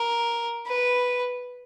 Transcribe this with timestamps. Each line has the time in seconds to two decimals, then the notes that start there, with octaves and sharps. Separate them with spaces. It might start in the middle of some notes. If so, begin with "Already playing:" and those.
Already playing: A#4
0.67 B4